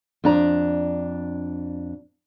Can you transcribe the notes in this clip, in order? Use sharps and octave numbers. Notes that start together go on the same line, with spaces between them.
F2 D4 A#5